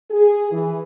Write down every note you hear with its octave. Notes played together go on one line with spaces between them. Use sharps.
G#4
E3